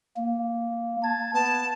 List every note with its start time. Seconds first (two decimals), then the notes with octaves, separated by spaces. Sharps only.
0.17 A#3
1.04 A5 G#6
1.34 B3 A5